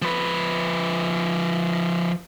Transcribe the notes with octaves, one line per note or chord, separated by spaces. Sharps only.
F3 B4